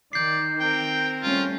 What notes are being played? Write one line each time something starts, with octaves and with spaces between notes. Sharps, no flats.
D#3 D5 G6 C7
C4 A#4 G5
G3 A3 C#4 F4